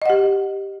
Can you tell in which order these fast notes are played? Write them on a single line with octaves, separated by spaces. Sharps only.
D#5 F#5 G4